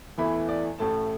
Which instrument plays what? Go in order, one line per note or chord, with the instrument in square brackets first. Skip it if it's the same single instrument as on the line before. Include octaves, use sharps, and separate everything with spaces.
[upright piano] E2 E3 A3 E4 B5
D5
A1 A2 A3 A5